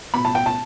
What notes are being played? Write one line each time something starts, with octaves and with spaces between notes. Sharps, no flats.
B2 B5
A5
G5
A5